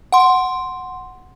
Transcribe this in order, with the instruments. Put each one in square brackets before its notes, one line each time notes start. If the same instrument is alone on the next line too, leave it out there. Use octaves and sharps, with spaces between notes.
[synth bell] F#5 C6